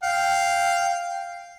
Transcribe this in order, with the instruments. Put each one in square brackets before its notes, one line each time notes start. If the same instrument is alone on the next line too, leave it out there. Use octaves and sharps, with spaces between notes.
[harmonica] F5 G5